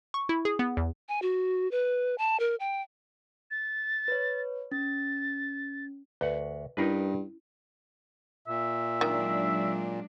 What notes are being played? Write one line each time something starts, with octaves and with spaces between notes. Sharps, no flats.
C#6
E4
G#4
B3
E2
G#5
F#4
B4
A5
A#4
G5
A6
B4 C#5
C#4 A6
D2 B4 F#5
G2 C#4 D#4 E4 A#4 B4
A#2 E5
D#3 F#3 G#3 D4